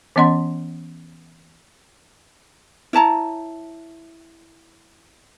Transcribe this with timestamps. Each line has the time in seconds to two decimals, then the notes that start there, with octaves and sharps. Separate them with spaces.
0.16 E3 B3 C#4 D#5 F#5 C6
2.93 E4 C#5 A5 A#5